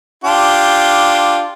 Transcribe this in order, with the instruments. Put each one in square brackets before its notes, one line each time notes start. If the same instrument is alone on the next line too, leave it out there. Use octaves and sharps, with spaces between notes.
[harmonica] D4 F4 G4